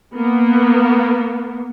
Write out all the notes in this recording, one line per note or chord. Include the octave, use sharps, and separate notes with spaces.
A#3 B3